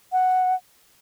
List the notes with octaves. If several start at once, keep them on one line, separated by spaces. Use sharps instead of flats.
F#5